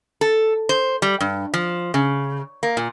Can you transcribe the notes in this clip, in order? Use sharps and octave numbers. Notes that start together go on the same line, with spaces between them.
A4
C5
G3
G2
F3
C#3
A#3
A#2